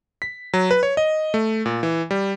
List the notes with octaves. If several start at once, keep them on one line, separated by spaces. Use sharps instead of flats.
B6
F#3
B4
C#5
D#5
A3
A#2
E3
G3